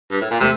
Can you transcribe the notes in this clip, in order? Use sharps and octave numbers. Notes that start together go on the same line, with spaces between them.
G2
A2
A#2
C3 A3